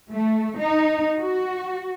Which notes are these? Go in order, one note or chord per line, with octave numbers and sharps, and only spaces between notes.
A3
D#4
F#4